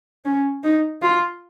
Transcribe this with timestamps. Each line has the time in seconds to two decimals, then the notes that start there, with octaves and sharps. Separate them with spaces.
0.25 C#4
0.64 D#4
1.02 F4